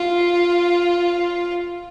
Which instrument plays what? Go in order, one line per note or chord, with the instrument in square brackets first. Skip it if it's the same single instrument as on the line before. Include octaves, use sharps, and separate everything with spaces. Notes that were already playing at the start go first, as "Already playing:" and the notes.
Already playing: [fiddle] F4